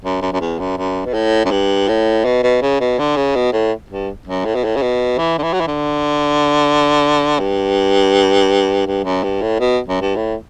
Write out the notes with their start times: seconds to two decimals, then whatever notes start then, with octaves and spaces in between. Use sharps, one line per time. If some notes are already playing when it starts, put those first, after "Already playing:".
0.05 F#2
0.22 F#2
0.33 F#2
0.41 E2
0.59 F#2
0.78 F#2
1.06 B2
1.14 A2
1.45 F#2
1.51 G2
1.88 A2
2.25 B2
2.44 B2
2.62 C#3
2.81 B2
2.99 D3
3.16 C#3
3.36 B2
3.53 A2
3.90 G2
4.27 F#2
4.45 A2
4.55 B2
4.64 A2
4.76 C#3
4.82 B2
5.18 E3
5.38 D3
5.43 E3
5.53 F#3
5.61 E3
5.67 D3
7.39 G2
8.86 G2
9.05 F#2
9.24 G2
9.42 A2
9.60 B2
9.88 F#2
10.01 G2
10.16 A2